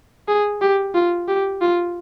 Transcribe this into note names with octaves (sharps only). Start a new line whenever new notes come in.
G#4
G4
F4
G4
F4